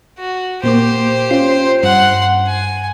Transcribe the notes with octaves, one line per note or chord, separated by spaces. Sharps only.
F#4
A#2 A#3 G4 C5 D6
C#4 F4 C7
G2 F#5 C6
G#5